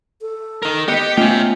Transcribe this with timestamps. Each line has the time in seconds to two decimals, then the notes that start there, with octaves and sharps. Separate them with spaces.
0.21 A4
0.63 D#4 A#4
0.88 B3 G4 D#5 C#7
1.17 A3 B3 C#4 F4 E5 G5